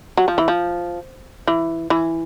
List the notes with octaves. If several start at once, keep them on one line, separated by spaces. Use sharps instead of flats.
F#3
F3
E3
F3
E3
E3